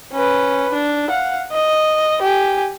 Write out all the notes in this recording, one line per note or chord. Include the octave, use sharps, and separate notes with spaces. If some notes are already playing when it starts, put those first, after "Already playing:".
C#4 B4
D4
F5 F#5
D#5
G4 G#5